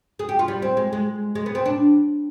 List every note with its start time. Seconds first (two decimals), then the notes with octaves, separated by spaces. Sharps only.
0.19 G#4
0.29 G4
0.39 F4
0.48 G3
0.62 C4
0.77 G#3
0.93 G#3
1.35 G#3
1.46 B3
1.55 C4
1.66 D4